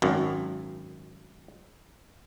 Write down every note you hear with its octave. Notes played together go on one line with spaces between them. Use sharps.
G#1 F#2